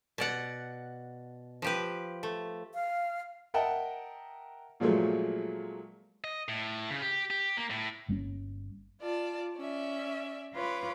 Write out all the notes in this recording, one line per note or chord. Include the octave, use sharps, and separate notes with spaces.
B2 D5 F#5
F3 G4 B4
A3
F5
A#4 D#5 E5 F#5 G5 A5
A#2 F3 F#3 G#3 A3
D#5
A2
C#3
G4
G4
A#3
A2
G1 G3 A#3 C#4
F4 D5 A5
C#4 D5 E5
F4 B4 C#5 B5 D6